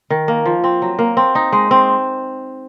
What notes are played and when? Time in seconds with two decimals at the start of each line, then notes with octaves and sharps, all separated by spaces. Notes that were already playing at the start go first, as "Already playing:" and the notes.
0.10 D#3
0.28 A#3
0.46 F3
0.64 C4
0.82 F#3
0.99 A#3
1.17 C4
1.35 D#4
1.53 G#3
1.71 C4